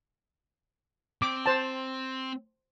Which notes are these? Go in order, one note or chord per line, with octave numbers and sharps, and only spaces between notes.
C4 D6
C5 A5